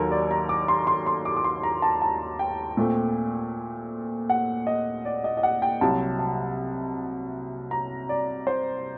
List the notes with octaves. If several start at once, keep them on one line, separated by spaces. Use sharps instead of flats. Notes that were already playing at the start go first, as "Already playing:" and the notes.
Already playing: D#2 D#3 F#3 A4 A#4
D5
A#5
D6
C6
C6
C6
D6
D6
C6
A#5
A5
A5
G5
A#2 A3 C4
F#5
D#5
D5
D#5
D#5
F#5
G5
C2 C3 F#3 A5
A5
A#5
D5
C5